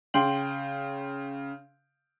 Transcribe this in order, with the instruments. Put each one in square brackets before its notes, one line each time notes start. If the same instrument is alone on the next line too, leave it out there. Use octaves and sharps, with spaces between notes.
[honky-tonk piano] C#3 G5 C6 F#7